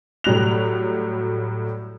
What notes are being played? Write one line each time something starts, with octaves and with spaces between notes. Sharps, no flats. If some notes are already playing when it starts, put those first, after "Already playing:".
A2 F#3 G3 F#6 F7